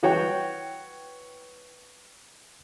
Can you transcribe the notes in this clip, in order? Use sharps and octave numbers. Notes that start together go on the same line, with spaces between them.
E3 F#4 C#5 G5